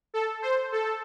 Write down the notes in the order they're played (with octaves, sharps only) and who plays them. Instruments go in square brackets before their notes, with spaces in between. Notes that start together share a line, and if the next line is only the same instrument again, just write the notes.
[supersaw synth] A4
C5
A4